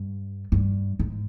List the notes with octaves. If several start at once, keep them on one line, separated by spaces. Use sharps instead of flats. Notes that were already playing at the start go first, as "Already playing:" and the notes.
Already playing: G2
G2
G#2